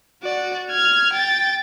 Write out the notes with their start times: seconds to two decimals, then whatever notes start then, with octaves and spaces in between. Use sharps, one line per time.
0.23 F#4 D5
0.71 F6 G#6
1.13 G5 A6